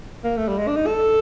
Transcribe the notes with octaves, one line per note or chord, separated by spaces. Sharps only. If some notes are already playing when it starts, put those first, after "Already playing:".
A#3
A3
G3
G#3
D4
D#4
A4